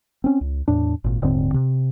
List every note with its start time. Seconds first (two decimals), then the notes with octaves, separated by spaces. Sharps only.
0.24 C4 C#4
0.41 C#2
0.68 E2 A2 D4
1.04 G#1 A#2
1.22 D#1 G#2 D3 C4
1.54 C3